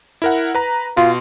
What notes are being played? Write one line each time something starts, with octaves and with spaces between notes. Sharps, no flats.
E4 A#4 F#5
B4 A#5
B2 F4 C6